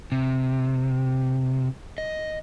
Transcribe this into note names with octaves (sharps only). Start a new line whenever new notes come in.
C3
D#5